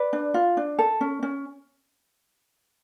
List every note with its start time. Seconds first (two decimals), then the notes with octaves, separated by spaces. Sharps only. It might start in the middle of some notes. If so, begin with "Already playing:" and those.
Already playing: B4 D5
0.13 D4
0.34 F4
0.57 D4
0.79 A4
1.01 C#4
1.23 C#4